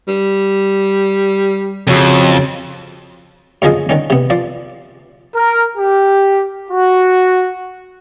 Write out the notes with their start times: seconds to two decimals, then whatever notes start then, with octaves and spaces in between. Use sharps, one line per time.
0.08 G3
1.87 F2 C#3 C#4 F#4
3.62 F#2 D3 F3 G#4 D#5
3.89 D3 D#3 C#4
4.10 C3 B3
4.30 F3 D5
5.36 A#4
5.78 G4
6.71 F#4